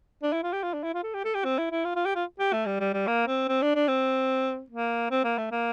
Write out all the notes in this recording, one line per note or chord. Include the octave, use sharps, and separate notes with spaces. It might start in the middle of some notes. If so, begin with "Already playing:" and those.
D4
E4
F4
G4
F4
D4
E4
F4
A4
G4
A4
G4
C4
E4
E4
F4
F4
G4
F4
G4
A3
G3
G3
G3
A#3
C4
C4
D4
D4
C4
A#3
C4
A#3
A3
A#3